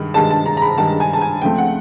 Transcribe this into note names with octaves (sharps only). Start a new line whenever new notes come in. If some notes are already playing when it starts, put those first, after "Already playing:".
Already playing: G2 D#3 G#3
G2 D#3 G#3 A5
A5
A#5
A#5
B5
G2 D#3 G#3 A5
G#5
A5
G#5
C#2 C#3 F3 A3 C4 G5
F#5